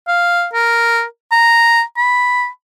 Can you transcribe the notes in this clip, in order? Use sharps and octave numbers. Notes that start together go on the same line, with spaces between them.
F5
A#4
A#5
B5